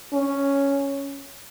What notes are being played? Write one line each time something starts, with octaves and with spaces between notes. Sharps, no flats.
C#4